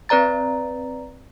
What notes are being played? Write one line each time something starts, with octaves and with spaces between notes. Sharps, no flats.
C4 B4 D5 A#5 A6